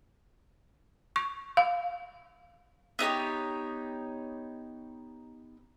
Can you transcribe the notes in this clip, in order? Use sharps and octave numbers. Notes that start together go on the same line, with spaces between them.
C#6
F5
B3 D#4 G4 C#5